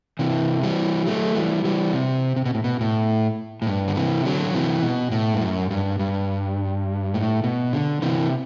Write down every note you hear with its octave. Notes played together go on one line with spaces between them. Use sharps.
C3 E3
E3 G3
F#3 A3
E3 G3
E3 G3
C3
C3
B2
A2
B2
A2
A2
G2
D3
C3 E3
D3 F#3
C3 E3
B2
A2
G2
F#2
G2
G2
A2
B2
D3
C3 E3